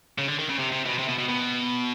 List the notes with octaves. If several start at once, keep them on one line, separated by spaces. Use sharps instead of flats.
C#3
D3
D#3
C#3
C3
C3
B2
C3
B2
B2
B2